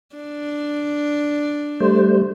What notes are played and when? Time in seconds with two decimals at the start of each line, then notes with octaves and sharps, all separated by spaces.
0.15 D4
1.80 G3 A3 C5